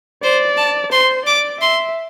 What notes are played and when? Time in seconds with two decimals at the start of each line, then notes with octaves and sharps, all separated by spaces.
0.23 C5 D5
0.57 A5
0.92 C5 C6
1.26 D5 D6
1.61 E5 C6